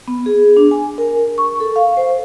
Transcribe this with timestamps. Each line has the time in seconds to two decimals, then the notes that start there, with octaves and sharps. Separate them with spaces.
0.08 B3
0.26 G#4
0.57 D4
0.71 G#5
0.98 A#4
1.38 C#6
1.60 A4
1.76 F5
1.97 C5